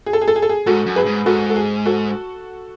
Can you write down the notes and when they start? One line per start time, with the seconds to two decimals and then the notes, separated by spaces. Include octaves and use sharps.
0.06 G#4
0.13 A4
0.21 G#4
0.28 A4
0.36 G#4
0.42 A4
0.49 G#4
0.66 G#2 F#4 A4
0.86 F#2
0.96 G#4 B4
1.06 G#2
1.26 G#2 F#4 A4
1.50 A4
1.56 G#4
1.86 F#4 A4